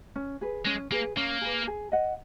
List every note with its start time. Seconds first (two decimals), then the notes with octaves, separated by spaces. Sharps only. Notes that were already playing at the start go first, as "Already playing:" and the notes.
0.16 C#4
0.41 G#4 B4
0.65 G#3 C#4
0.91 A#3 G#4 B4
1.17 A#3 C#4
1.41 G#4 B4
1.67 G#4
1.92 D#5 F#5